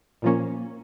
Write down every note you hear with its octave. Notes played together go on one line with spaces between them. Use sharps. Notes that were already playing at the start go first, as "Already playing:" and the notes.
A#2 F3 A#3 C#4